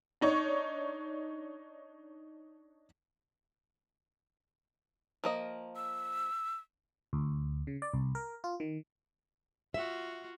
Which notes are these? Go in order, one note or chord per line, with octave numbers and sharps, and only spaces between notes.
D4 D#4 C#5 C#6
F3 A#3 D#5
E6
D2
C#3
D5
C2
A#4
F4
D#3
F4 F#4 E5